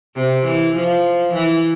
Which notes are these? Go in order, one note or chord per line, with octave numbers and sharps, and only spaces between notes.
C3
E3
F3
E3